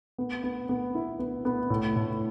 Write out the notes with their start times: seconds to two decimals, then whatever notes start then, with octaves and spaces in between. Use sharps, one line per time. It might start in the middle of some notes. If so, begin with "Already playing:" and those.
0.18 B3
0.44 B3
0.69 B3
0.95 E4
1.19 B3
1.45 B3
1.70 A2
1.96 A2